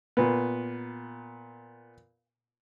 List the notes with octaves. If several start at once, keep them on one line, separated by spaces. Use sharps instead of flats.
A#2 B3